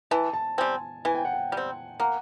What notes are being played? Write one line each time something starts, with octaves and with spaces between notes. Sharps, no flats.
E3 A5
A5
G3 C4 G#5
E3 G#5
G5
F#5
G5
G3
C4
A#3 F#5